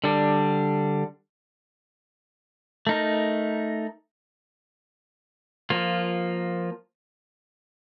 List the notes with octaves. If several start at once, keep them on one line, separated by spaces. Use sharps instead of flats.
D3 G3 D4
A3 D#4 A#4
F3 A#3 F4